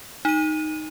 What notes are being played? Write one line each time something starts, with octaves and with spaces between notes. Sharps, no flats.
D#4 D#7